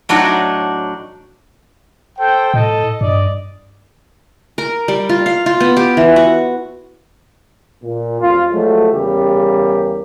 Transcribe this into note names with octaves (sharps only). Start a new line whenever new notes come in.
A2 F#3 D4 D#4 F#4
A4 C5 G5
A2 A4 D#5
G2 D5 D#5
A#4
G3
F4
F5
F4
B3
G4
E3
F#4
A#2
A1 F2 F4
F3 F#3 G#3 A3
E2 C#3 G3 A#3 G4